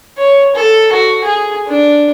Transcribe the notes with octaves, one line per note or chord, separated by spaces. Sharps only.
C#5
A4
F#4
G#4
D4